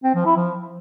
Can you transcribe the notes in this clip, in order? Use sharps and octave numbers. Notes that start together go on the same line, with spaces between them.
C4
F3
E4
F3